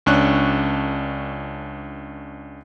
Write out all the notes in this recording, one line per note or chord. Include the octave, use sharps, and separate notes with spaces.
C#2 C#4 D4 C#6 F#6